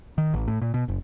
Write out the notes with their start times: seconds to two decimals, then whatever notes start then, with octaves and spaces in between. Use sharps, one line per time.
0.18 D#3
0.34 A1
0.48 A2
0.62 A#2
0.74 B2
0.88 F#1